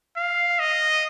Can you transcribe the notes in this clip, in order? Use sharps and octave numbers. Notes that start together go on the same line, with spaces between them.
F5
D#5